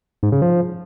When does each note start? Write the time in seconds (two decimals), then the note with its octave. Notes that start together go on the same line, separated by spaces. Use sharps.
0.23 G#2
0.32 C#3
0.42 F3